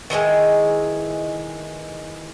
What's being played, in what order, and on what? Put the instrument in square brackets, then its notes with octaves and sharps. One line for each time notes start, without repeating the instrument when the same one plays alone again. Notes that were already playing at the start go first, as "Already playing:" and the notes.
[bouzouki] D#3 E3 F#3 G#3